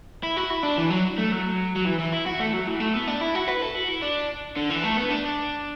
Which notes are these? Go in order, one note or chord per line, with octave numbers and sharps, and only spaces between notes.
E4
F#4
E4
D4
E3
F#3
A3
F#3
F#3
E3
E3
E4
F#4
A3
F#3
E3
A3
B3
D4
E4
F#4
B4
A4
F#4
E4
D4
D3
E3
A3
B3
D4